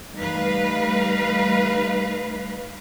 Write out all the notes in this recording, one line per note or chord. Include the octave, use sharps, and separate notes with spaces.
G3 A3 D#4 B4 F5